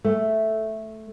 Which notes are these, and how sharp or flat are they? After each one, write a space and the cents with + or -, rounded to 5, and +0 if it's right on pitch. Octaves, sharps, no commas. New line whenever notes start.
A3 -5